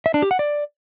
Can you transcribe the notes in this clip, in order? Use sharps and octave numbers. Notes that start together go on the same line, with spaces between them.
E5
D4
G4
F#5
D5